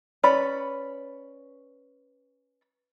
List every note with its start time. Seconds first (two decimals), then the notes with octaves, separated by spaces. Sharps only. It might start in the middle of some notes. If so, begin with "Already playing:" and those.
0.23 C#4 B4 D5 B5